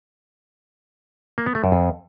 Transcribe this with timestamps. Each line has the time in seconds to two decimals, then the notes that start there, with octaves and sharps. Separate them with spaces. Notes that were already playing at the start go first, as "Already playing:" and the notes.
1.38 A#3
1.46 B3
1.55 A3
1.64 F#2
1.72 F2